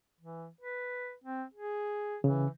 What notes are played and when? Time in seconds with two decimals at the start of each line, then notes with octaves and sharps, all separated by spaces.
0.20 E3
0.61 B4
1.24 C4
1.54 G#4
2.24 C#3 E3